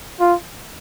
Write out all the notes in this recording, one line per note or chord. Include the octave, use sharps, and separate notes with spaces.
F4